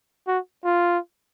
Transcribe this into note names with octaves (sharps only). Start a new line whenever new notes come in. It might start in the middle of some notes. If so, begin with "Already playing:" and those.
F#4
F4